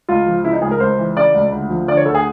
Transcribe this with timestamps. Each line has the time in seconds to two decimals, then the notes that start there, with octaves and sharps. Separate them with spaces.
0.09 C#2 F4
0.26 F3
0.44 C#3 E4
0.53 D#4
0.62 C#2 G#4
0.71 A#4
0.80 C#2 C5
0.98 E3
1.16 C#3 D5
1.35 C#2
1.52 D2
1.70 F3
1.88 D3 D5
1.97 C#5
2.05 D2 A4
2.15 G#4